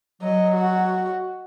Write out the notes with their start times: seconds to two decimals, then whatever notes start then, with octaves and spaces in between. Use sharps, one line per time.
0.22 F#3 D#5
0.55 F#4